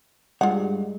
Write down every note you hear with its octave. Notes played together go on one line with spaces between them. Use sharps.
G2 G3 G#3 F4 F#5